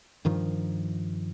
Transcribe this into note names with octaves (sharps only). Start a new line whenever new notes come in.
G2 D#3 F3